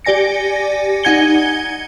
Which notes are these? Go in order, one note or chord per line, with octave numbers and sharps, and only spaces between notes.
G4 D5 G#5 A#6 C#7
D#4 F#5 G#5 G#6 C#7 G7